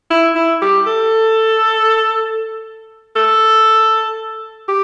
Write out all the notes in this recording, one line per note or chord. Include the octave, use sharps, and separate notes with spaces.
E4
E4
G4
A4
A4
G4